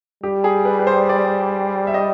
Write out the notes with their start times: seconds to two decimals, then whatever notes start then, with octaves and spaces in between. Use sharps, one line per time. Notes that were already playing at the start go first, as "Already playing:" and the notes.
0.23 G3 G4
0.44 G#4
0.65 B4
0.79 B4
0.87 C5
1.09 D5
1.87 E5
1.94 D#5